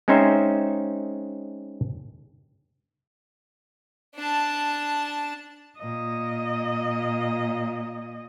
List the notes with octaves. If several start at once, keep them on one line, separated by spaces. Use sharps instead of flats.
G#3 C4 C#4 D#4 C5 E5
D4 A5
A#2 D#5